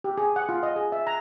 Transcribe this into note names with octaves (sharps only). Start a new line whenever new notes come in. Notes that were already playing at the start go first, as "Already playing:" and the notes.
G4
G#4
F#5
F4
D#5
G#4
E5
A#5